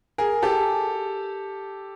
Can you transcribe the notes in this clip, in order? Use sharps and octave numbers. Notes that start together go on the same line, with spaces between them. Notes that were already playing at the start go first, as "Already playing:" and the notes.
G#4 A#4
G4 A4